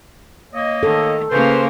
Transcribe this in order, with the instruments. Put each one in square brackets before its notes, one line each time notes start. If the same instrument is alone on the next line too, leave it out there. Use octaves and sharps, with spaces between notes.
[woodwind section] A#3 C#5 D#5
[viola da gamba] D#3 [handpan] A4
[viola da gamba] C#3 A#3 [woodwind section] B4 C5